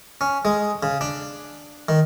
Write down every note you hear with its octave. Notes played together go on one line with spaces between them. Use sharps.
C#4
G#3
C#3
D4
D#3